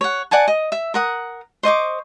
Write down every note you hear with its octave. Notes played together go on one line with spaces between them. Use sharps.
C#5 F#5
D5 F#5 G#5 A5
D#5
E5
A#4 F#5 D#6
C5 D#5 C#6 D6